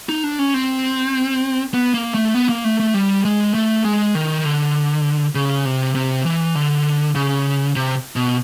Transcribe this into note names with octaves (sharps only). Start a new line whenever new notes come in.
D#4
D4
C#4
C4
B3
A#3
A3
B3
A#3
A3
A3
G3
G#3
A3
G#3
D#3
D3
C#3
C3
C3
E3
D3
C#3
C3
B2